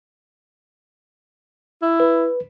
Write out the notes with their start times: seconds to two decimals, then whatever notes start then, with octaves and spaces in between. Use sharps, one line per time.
1.82 E4
2.00 B4